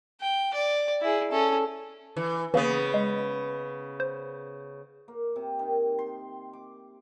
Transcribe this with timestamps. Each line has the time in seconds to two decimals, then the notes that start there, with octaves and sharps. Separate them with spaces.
0.21 G5
0.54 D5
1.01 E4 G#4
1.32 C#4 A4
2.17 E3
2.54 C#3 E3 A#3 B3
2.94 G#3
4.00 C5
5.08 A#3
5.36 C3
5.59 D#3
5.99 C6
6.53 D6